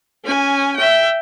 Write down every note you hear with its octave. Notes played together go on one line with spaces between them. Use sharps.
C#4 G#5
E5 G5